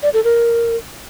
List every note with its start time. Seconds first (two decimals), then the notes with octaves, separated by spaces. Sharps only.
0.03 D5
0.14 A4
0.24 A#4